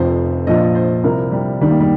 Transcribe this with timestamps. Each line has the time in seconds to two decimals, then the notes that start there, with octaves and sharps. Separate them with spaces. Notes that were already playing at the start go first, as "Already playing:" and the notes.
Already playing: F1 F2 C3 F3 C5
0.47 A#1 A#2 F3 D#5
0.75 C5
1.03 C2 C3 F3 A#4
1.32 G3
1.61 D#2 D#3 G3
1.70 A#3
1.80 G3